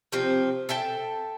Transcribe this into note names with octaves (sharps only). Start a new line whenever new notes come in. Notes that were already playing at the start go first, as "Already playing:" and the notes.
C3 F3 C4
A4 E5 G5 A5